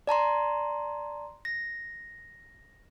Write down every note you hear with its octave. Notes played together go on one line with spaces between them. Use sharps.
D5 A5 A#5 C6
A#6